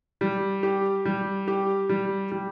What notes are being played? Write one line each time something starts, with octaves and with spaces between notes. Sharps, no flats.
G3
G4
G3
G4
G3
G3